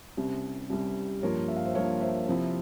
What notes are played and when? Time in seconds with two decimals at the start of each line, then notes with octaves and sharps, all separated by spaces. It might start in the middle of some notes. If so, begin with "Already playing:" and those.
0.17 C2 C3 G3 C#4
0.69 C2 C3 G3 C#4
1.23 G2 F3 A#3 F4 A#4 C#5
1.48 E5
1.56 F5
1.66 C5 E5
1.75 G2 F3 A#3 F4 A#4 C#5
2.01 C5 E5
2.27 C3 F3 C4 E4 C5